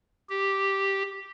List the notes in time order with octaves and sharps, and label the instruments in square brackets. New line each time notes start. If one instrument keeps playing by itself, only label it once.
[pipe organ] G4